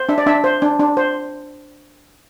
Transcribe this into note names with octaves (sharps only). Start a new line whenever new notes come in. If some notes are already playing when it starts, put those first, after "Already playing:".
Already playing: C5
D4 E5
D5
D4 E5
C5
D4
D4
C5